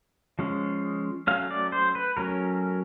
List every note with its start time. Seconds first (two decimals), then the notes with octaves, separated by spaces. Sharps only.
0.39 F3 G#3 C#4
1.27 F#3 A3 C#4 F5
1.51 D5
1.72 C5
1.95 B4
2.17 F#3 A3 C#4 A#4